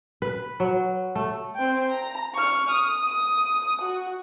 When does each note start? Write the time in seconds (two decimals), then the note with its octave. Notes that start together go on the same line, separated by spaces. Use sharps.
0.22 B4
0.60 F#3
1.16 A3
1.56 C4 G5
1.91 A#5
2.34 C#6 F6
2.70 D#6
3.04 D#6
3.82 F#4